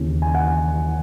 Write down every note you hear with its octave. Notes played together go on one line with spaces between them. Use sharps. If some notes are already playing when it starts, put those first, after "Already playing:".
Already playing: D#2 C#3 E3
G#5
F#5